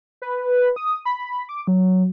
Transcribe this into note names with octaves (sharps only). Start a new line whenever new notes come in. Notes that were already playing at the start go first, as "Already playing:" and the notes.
B4
D#6
B5
D6
F#3